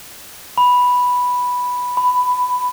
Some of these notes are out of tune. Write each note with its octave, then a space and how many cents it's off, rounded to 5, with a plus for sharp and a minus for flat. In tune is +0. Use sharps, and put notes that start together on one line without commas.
B5 -5
B5 +10